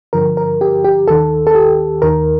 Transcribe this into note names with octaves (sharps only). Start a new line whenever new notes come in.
G2 D3 F3 A#4
A#4
G4
G4
D#2 D#3 A4
A4
G4
D#2 D#3 A#4